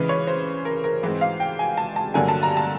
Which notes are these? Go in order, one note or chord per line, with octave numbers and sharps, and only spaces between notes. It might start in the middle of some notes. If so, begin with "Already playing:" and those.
Already playing: C#3 E3 G#3 B4
C#5
C5
A#4
A#4
G#2 E3 G#3 C4
F5
G5
G#5
A5
A5
G2 D3 F#3 A#3 G#5
A5
A#5
A5